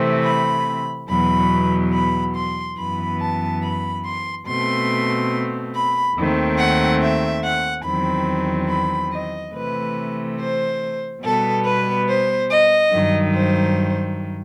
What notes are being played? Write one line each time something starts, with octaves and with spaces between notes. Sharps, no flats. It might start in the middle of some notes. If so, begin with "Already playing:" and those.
Already playing: C3 E3 A3 C4
B5
E2 B2 F#3 B5
B5
C6
F#2 E3 B3 B5
A5
B5
C6
B2 A3 C4 C6
B5
D#2 D#3 A3 C4
F#5
E5
F#5
E2 D#3 F#3 C4 B5
B5
D#5
C3 E3 A3 B4
C5
B2 G3 B3 A4
B4
C5
D#5
G2 D#3 F#3
C5